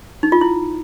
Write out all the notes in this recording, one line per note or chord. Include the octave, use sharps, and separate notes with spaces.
D#4
F4
E4